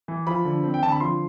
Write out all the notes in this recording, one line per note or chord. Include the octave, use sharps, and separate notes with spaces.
E3
F3 B5
D3
C4
G5
D3 A5
B5
F3 C6